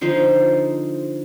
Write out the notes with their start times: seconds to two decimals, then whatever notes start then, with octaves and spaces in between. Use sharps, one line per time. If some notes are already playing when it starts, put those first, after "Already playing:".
0.01 D3 F3 D#4 C5